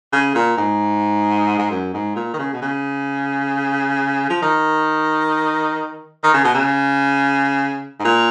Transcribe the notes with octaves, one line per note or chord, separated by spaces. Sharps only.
C#3
A#2
G#2
G#2
F#2
G#2
A#2
D#3
C#3
B2
C#3
F3
D#3
D#3
C#3
B2
C#3
G#2
A#2